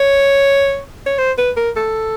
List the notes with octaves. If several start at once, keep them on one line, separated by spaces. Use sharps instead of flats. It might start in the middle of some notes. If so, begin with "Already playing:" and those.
Already playing: C#5
C#5
C5
B4
A#4
A4